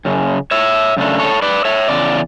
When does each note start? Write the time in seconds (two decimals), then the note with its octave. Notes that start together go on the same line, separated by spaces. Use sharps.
0.05 F#2 C#3
0.51 C#5 E5
0.97 F#2 C#3 A3 D4
1.19 A4 C#5
1.42 B4 D5
1.65 C#5 E5
1.88 E2 C#3 D5